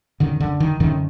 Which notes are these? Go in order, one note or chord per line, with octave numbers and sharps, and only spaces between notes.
F#2 D3 D#3
D3
D#3
F#2 D3 D#3